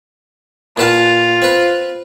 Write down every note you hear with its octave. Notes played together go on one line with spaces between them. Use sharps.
A#2 F4 B4 A5
C4 B4